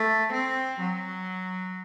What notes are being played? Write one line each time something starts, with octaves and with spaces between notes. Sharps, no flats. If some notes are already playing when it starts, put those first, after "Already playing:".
Already playing: A3
C4
F#3